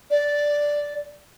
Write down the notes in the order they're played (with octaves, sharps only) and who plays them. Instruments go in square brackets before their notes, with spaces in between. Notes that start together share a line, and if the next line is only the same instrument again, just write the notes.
[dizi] D5